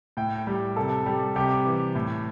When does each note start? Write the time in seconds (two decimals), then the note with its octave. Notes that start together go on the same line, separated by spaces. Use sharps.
0.17 A2 G5
0.47 G3
0.77 C3 A4
1.06 G3
1.36 C3 G4
1.66 E3
1.95 A2